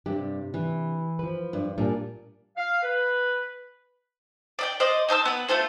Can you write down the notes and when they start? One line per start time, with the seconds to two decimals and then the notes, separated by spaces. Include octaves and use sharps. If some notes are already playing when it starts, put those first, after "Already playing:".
0.06 G2 C3 D4 G4
0.54 E3
1.19 F3 B4
1.53 G2
1.78 A#2 G3 D4 G#5
2.57 F5
2.83 B4
4.59 D5 D#5 G5
4.80 C5 D5 D#5
5.08 D#4 C5 A5 E6
5.25 B3 B4
5.48 A3 F4 A4 C5